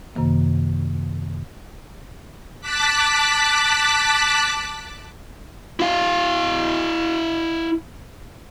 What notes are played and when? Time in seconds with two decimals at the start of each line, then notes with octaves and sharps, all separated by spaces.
0.15 F#2 C3 D#3 A#3
2.61 A5 D6 F#6 B6
5.80 E4 F5